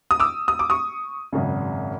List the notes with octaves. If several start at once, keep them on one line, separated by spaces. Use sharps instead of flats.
D#6
D6 E6
D#6
D6
C#6 D#6
G#1 F#2 C#3